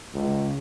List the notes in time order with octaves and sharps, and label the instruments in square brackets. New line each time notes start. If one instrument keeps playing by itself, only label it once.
[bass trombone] C#2